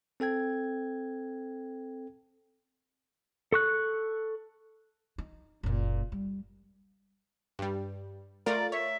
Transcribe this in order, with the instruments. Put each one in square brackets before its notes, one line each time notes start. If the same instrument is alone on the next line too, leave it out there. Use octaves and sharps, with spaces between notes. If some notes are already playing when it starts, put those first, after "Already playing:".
[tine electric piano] C4 A4 G5 G#6
[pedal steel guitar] A4 C#6 F#6
[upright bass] D#4
F#1 A#2
G3
[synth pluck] G2 G3
[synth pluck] A3 F4 A#4 [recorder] D5
[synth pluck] C#5 [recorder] E5